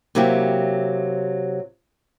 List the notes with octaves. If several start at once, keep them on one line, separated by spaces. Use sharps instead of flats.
C3 F#3 A#3 E4 G4